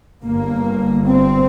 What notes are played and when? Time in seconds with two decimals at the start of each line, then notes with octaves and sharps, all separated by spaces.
0.24 G1 G2 A#3
1.06 C4